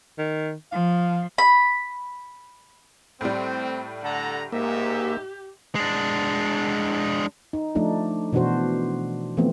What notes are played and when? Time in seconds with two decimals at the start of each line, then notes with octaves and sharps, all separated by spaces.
0.18 D#3
0.72 F3 F5
1.38 B5
3.21 A2 G3 C4
4.03 D3 A4 F#5 A#5
4.52 G#2 A#3 G4 E5
5.75 G#3 D4
7.53 D#4
7.75 F3 A3 D4 D#4
8.33 B2 E3 D4 F#4 C5
9.37 E3 F3 A3 B3 C4